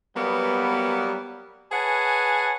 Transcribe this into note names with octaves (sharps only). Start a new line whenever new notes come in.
F#3 G3 A#3 B3
G#4 B4 C#5 F#5 G#5 A5